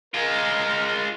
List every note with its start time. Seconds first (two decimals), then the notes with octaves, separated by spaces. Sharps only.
0.14 G#3 F4 A#4